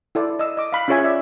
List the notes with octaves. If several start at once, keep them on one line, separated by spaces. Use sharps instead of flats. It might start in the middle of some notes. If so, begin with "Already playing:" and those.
E4 A4 D5
D#5 E6
D#5 D6
F5 B5
C#4 F4 G#4 C#5 E5 G#5
D5 E5